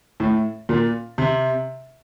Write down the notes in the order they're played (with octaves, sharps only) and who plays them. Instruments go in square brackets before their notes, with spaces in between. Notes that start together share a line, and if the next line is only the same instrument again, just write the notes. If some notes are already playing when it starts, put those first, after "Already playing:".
[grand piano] A2
A#2
C3